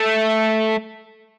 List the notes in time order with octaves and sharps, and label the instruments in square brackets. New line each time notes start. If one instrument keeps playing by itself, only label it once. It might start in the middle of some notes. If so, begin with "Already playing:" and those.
Already playing: [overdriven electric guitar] A3